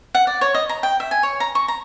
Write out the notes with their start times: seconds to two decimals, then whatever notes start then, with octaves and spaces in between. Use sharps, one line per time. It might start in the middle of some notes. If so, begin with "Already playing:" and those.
0.15 F#5
0.27 D5
0.41 C#5
0.54 D#5
0.69 A#5
0.83 G5
1.00 E5
1.11 G#5
1.23 C#5
1.40 A#5
1.55 C#6
1.68 A#5